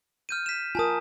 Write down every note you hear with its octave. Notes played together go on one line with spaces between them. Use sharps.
F6 G6 D#7
B6 E7
F4 A#4 G#5 A5 D#6